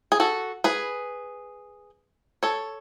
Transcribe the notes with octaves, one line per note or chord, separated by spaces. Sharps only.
G#4
F#4 A4
G#4 B4
A4 C#5